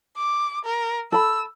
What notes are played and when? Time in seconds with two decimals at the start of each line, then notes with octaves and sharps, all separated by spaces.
0.17 D6
0.65 A#4
1.12 A4 B5 E6